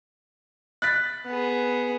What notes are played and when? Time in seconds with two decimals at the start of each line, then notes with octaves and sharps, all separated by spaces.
0.82 F#6 A6 B6
1.26 B3 G#4